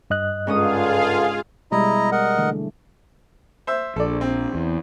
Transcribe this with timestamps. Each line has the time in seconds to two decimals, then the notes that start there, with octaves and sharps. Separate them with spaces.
0.10 G2 D#5 F#6
0.47 C#2 G#2 D3 C#4 F4 G#4 F5 D#6
1.72 B2 G3 G#3 E4 D#5 A#5
2.12 A#4 D#5 F#5
2.38 D3 E3 A3
3.67 C5 E5
3.96 A#1 A4 D5
4.21 C4
4.55 E2